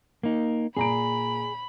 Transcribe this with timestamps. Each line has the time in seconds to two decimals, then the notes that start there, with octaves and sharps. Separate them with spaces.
0.23 A#3 D#4
0.77 A#2 G#4 A#5 B5 D7